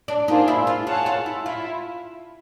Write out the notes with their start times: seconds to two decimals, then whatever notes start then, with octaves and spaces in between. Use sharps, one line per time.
0.08 D4
0.28 A#3 D4 D#4 F4 G#4 C5
0.48 E4
0.67 F4
0.87 F4 G#4 C#5 F#5 A5
1.06 F4
1.26 E4
1.46 E4 F4